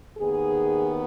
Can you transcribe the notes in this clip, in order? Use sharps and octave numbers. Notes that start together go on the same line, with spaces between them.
D#2 D#3 B3 G#4